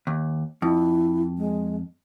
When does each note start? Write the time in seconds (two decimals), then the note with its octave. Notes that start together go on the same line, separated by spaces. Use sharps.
0.07 D#2
0.62 F2 E4
1.37 G#3